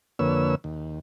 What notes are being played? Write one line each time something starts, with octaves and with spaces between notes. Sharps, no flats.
F2 D3 A#3 B4 C#5 E6
D#2